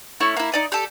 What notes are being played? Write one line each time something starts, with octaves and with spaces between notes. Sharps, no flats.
A3 C#4 E4
A#3 E4
D#4 D5 D#5
G4 A4